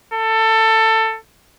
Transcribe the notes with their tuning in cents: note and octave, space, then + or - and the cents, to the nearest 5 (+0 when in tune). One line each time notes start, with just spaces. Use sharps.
A4 +20